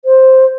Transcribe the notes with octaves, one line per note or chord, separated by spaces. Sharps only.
C5